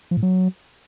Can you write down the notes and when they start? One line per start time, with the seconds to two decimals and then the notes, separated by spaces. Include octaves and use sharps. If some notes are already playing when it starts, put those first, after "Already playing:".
0.11 F3
0.17 A2
0.23 F#3